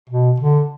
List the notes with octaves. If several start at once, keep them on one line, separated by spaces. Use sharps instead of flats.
B2
D3